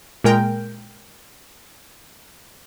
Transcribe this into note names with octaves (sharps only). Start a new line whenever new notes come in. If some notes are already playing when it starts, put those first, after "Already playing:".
A#2 G#3 A#4 G5